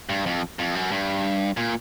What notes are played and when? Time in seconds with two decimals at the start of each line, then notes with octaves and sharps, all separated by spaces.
0.09 G2
0.26 F2
0.59 F2
0.75 F#2
0.91 G2
1.57 A#2